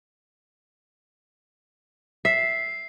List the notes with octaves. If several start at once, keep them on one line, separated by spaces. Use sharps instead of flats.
E5 C7